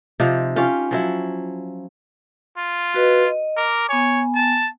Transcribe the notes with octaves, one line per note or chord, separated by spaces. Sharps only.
C3 F3 D#4
C#4 F4 G4
F3 F#3 E4
F4
F#4 B4 D#5
D#5
A#4 D6
B3 C#5 G#5
A5